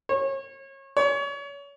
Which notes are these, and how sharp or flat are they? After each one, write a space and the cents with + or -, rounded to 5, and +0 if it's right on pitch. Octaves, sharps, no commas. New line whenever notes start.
C#5 -30
C#5 +30